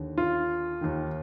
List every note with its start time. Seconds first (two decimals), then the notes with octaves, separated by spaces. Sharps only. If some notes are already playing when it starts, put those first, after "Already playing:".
Already playing: D#2 D3
0.18 F4
0.81 D#2 D#3